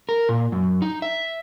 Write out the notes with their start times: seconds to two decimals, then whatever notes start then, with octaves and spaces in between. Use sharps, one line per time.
0.09 A#4
0.29 A#2
0.52 F#2
0.82 D#4
1.02 E5